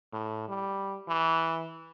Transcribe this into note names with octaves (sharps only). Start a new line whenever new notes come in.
A2
G3
E3